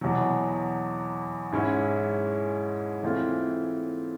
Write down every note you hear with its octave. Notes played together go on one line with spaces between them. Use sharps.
E2 B2 F#3
G#2 E3 G#3 C#4 E4
E3 A3 C4 F4